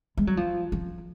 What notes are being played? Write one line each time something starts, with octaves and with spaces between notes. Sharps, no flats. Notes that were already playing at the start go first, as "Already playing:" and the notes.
G#3
F#3
F3
F3